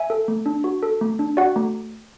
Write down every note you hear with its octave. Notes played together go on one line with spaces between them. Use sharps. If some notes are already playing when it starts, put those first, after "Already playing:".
Already playing: E5 G#5
A4
A3
D4
F#4
A4
A3
D4
F#4 D5 F#5
A3